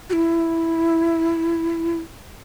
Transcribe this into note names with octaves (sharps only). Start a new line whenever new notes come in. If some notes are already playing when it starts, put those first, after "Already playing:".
F#4
E4